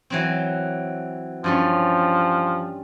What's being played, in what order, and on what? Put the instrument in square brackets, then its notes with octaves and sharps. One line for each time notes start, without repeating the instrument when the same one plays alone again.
[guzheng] E3 F#3 C4
[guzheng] G2 G3 C#4 [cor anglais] F3